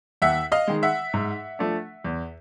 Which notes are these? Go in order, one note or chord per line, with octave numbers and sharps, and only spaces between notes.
D#2 E5 F#5
D#5 F5
D#3 G#3
E5 F#5
G#2
F3 A3 D4
E2